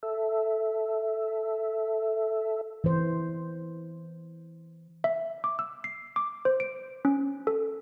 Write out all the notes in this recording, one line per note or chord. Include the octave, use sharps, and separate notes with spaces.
A4 E5
E3 C5
E5
D6
E6
C7
D6
C5
D7
C#4
A4